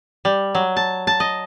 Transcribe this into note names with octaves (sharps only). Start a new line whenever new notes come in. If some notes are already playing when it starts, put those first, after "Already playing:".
G3
F#3
A5
A5
D#5